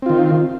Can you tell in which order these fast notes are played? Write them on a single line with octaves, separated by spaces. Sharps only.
C4 F4 D#3